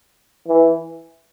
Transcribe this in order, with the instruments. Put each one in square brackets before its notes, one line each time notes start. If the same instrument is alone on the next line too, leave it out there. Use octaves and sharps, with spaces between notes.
[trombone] E3